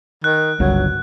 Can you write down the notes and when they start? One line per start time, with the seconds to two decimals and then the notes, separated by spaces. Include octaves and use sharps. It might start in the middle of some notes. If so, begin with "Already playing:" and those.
0.24 D#3 F#6
0.60 G1 C#2 G2 F#3